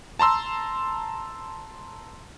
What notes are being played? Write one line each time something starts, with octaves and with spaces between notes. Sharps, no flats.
A5 A#5 C6 E6